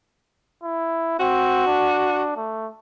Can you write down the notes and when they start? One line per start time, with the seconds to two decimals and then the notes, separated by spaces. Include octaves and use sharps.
0.63 E4
1.20 C4 F#4
1.67 D4
2.37 A3